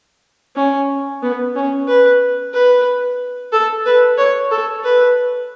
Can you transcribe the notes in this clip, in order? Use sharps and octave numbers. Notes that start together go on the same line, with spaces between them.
C#4
B3
C#4
B4
B4
A4
B4
C#5
A4
B4